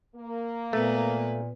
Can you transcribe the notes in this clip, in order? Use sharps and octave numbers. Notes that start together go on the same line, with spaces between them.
A#3
A#2 A3 B3 B4